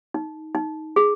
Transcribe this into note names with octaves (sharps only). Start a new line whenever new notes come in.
D#4
D#4
G#4